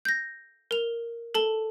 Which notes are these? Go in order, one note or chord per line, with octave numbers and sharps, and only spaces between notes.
G6 A#6
A#4 F7
A4 A5 G7